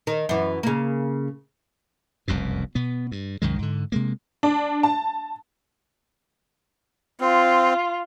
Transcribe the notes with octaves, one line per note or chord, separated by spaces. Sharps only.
D#3
F#2 E3
C#3 A#3
F1 C2 F#2 B2
B2 B3
G2
C2 F#2 D#3 G#3
G#2 D3
C3 G#3 A#3
D4
A5
C4 F4